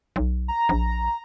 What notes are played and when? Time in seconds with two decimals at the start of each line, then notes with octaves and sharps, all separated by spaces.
0.16 B1
0.48 A#5
0.69 A#1